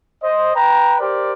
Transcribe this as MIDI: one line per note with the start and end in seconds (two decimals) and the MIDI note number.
0.23 0.54 72
0.23 0.54 75
0.55 0.96 71
0.55 0.96 79
0.55 0.96 82
1.00 1.33 67
1.00 1.33 70
1.00 1.33 72
1.00 1.33 74